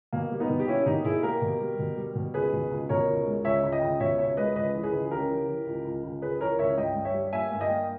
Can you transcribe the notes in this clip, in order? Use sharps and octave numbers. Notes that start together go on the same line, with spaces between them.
B2 A#3
G3
B3 D#4
B2
G4
A#3 C#4 E4
B2 D#4 G4
B2 E4 G#4
A#3 G4 A#4
B2
G3
B2
G3
B2
C#2 G#4 B4
B2
C#2
B2 A#4 C#5
C#2
G#3
C#2 C#5 E5
C#2
D#5 G5
C#2
B2 C#5 E5
C#2 C#5 E5
G#3 B4 D#5
C#2 B4 D#5
E3
G#4 B4
C#2
C#3 G4 A#4
E3
E3
C#2
C#2
C#2
C#2 G#4 B4
E3 A#4 C#5
C#2 C#5 E5
G2 D#5 G5
G2
C#5 E5
G3
A#3 E5 G#5
G2 E5
D#5 G5
A#3